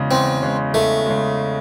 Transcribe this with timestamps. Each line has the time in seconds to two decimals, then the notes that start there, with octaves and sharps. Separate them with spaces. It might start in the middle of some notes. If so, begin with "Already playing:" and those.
Already playing: E2 C#3 G#3
0.11 E2 C4
0.43 C#3 G#3
0.74 E2 A3
1.06 C#3 G#3